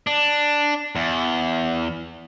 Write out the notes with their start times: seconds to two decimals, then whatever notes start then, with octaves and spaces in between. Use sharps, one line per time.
0.07 D4
0.96 E2